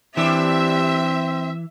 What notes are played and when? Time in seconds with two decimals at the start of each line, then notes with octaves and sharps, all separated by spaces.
0.17 E3 G3 C4 D4 E5